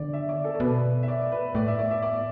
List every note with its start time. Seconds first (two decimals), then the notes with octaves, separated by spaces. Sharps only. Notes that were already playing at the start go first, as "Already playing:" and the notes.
Already playing: D3 D5
0.13 E5
0.29 D5
0.44 A4
0.55 D5
0.60 B2 B4
1.03 E5
1.08 D5
1.32 B4
1.55 A2 D5
1.68 E5
1.79 D5
1.91 E5
2.02 D5